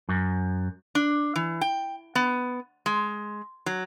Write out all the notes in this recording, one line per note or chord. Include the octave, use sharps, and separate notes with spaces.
F#2
D4
E3
G5
B3
G#3
F#3